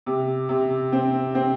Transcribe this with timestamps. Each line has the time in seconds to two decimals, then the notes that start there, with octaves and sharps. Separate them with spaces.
0.06 C3
0.49 C3
0.92 C4
1.35 C4